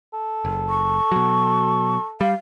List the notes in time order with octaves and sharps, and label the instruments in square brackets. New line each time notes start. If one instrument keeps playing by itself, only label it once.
[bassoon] A4
[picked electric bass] F#1
[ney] C#6
[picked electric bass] B2 F#3
[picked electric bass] G3 [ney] F5